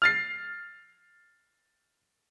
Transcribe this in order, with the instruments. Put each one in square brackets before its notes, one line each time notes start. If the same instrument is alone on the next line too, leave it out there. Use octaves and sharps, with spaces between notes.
[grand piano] F6 A6 C7